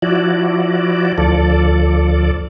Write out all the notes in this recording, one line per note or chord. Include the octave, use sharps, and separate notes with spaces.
F3 E4 F#4 D5
D2 F3 A4 D5